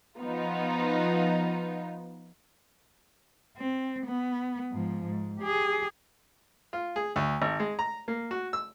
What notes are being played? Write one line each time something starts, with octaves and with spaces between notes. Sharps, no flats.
F3 B3 D#4 F4
C4
B3
G#2 F3
G#2
G4 G#4
F4
G#4
D2
G#1
G#3
A#5
A#3
F#4
E6